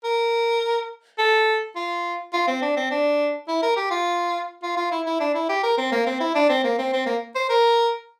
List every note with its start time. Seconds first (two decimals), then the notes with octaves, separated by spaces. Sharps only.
0.04 A#4
1.18 A4
1.76 F4
2.33 F4
2.48 C4
2.62 D4
2.76 C4
2.91 D4
3.48 E4
3.62 A#4
3.76 G4
3.91 F4
4.63 F4
4.77 F4
4.91 E4
5.06 E4
5.20 D4
5.34 E4
5.49 G4
5.63 A#4
5.78 C4
5.92 A#3
6.06 C4
6.20 E4
6.35 D4
6.49 C4
6.64 A#3
6.78 C4
6.93 C4
7.06 A#3
7.35 C5
7.49 A#4